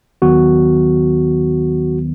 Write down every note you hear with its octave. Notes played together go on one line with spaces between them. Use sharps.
D#2 D#3 F#3 B3 F#4